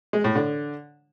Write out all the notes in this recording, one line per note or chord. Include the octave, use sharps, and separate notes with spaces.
G#3
A2
D3